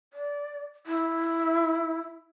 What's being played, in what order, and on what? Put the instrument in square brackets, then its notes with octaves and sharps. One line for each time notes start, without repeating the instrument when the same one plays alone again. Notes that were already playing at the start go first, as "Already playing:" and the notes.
[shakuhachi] D5
E4